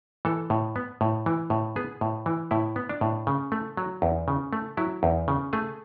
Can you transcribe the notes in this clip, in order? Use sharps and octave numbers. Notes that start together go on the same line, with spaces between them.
E3 A4
A2
B3
A2
E3
A2
B3 G#4
A2
E3
A2 E4
B3
D4
A2
C#3
A3
F#3
E2
C#3
A3
F#3 E4
E2
C#3
A3 G#4